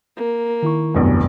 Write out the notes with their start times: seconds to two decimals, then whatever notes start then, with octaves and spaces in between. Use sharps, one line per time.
0.16 A#3
0.63 D#3 E4 C#6
0.95 F1 B1 G2